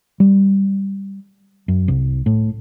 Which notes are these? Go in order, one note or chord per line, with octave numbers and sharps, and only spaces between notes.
G3
F#2
C2
A2